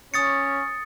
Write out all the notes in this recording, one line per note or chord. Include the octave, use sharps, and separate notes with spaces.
C#4 D#6 A6 C#7